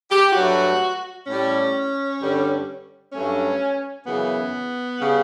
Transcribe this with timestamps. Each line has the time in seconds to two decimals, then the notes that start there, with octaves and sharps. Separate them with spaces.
0.10 G4
0.33 G2 F#3 A3 F#4
1.26 A2 G3 C#4
2.20 G2 D3 G3
3.12 G2 F#3 A3 C#4
4.05 F#2 C#3 E3 B3
4.99 C#3 G3